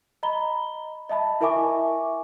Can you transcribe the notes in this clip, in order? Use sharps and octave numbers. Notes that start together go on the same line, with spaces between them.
D#5 A#5 B5 G7
D#5 E5 A5 B5
E4 A#4 E5 G#5 C#6 D6